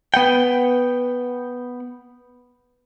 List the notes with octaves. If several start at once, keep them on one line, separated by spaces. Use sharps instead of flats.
B3 F#5 G5